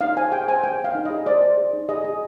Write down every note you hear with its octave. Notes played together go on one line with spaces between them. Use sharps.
D#4 F5
C5 G#5
G#4 G5
C5 G#5
C5 G5
G#4 F5
D#4
D#5
G#4
C5 D5
C5
G#4
D#4
G#4 D#5
G#4